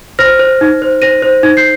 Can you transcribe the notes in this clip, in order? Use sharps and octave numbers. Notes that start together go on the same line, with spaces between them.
C5 F6 A#6
C5
D#4
C5
C5 A#6 D#7
C5
D#4
G6 C7